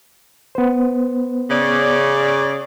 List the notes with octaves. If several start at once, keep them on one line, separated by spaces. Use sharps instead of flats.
B3 C5
C#3 D5